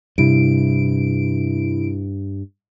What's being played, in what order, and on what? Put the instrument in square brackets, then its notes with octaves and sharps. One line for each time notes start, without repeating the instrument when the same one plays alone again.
[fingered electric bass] G2 [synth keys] C3 E4 D7